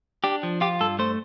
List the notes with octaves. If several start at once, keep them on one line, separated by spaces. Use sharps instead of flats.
D4 G4
F3
F4 G4
G2 A4
A3 C5